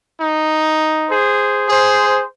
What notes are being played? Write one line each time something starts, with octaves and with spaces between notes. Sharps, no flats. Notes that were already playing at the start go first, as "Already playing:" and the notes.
D#4
G#4 C5
G#4 C5